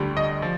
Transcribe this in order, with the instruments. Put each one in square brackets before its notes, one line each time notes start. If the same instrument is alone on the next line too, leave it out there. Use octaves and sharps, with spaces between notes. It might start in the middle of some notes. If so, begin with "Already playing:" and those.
Already playing: [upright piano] D2 D3 G3
D#5
F3